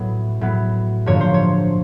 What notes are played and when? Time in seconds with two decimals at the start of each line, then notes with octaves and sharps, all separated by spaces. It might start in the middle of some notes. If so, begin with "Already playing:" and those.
Already playing: A2 F#3 B3
0.41 A2 F#3 B3
1.06 G2 D3 F3 A#3 C#5
1.21 C5
1.34 C#5